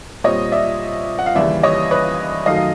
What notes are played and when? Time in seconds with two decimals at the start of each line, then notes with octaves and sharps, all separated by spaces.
0.24 A#2 G3 C4 C#5 D#5
0.52 D5 E5
1.19 F#5
1.26 F5
1.35 D#2 C#3 E3 G3 D5 E5
1.63 C#5 D#5
1.91 B4 C#5
2.46 F#2 D#3 F#3 A3 D#5 F5
2.56 F5